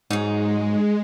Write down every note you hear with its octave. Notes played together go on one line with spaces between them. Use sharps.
G#2 F#3 G#3 D#4